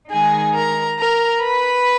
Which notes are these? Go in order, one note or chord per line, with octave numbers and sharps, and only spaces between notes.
D#3 G#3 D#4 G#4 G#5
A#4 A#5
A#4 A#5
B4 B5